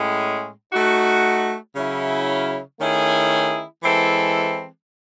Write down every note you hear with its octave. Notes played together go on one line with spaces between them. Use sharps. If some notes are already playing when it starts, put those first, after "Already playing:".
Already playing: A2 G#3 C#4
A3 D#4 F#4
C#3 F#3 C#4 E4
D#3 A3 C#4 E4 G#4
E3 G#3 C4 E4 A4